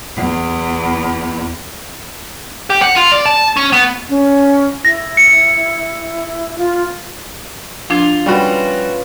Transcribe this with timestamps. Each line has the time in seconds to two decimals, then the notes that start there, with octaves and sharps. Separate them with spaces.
0.16 E2
2.70 G4
2.82 F#5
2.95 F4
3.12 D5
3.26 A5
3.57 C#4
3.72 B3
4.09 C#4
4.85 E4 A#6
5.17 C#7
6.58 F4
7.90 F3 D4 F4 G#6
8.26 G3 C#4 F#4 B4